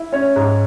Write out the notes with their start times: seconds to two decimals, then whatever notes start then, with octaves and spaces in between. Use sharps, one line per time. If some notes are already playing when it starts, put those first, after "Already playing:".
Already playing: E4
0.12 C#4 C#5
0.36 G#2